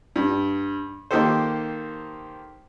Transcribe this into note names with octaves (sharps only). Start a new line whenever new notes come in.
G2
D#3 A#3 D#4 G4 A4 C5